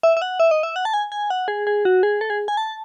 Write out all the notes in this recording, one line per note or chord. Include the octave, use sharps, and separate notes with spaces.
E5
E5
F#5
E5
D#5
E5
F#5
A5
G#5
G#5
F#5
G#4
G#4
F#4
G#4
A4
G#4
G#5
A5